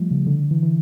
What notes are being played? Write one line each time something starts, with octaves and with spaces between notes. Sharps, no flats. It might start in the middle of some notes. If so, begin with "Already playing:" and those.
Already playing: F3 G3 A3
C#3
D3
E3
E3